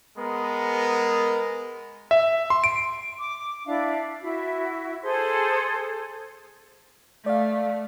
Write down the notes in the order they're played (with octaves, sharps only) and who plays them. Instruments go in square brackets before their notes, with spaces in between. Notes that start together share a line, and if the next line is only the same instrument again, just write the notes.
[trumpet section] G#3 B3 A#4
[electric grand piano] E5
C6
D7
[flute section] D6
D4 E4 E5 F5
E4 F#4 E5
G#4 A4 C5 C6
[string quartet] A3 [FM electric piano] D5 F5